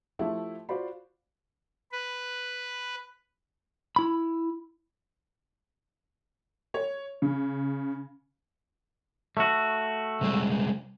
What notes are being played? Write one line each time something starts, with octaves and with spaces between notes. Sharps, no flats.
F3 A3 E4 G4
F4 F#4 C5 D5 B5
B4
E4 B5
C#5
C#3
A3 F#4
C3 G3 G#3